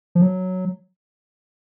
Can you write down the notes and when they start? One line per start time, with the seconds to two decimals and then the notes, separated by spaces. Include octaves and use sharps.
0.15 F3
0.22 F#3